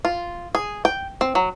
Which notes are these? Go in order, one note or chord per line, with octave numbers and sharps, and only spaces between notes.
F4
G#4
G5
C4
F#3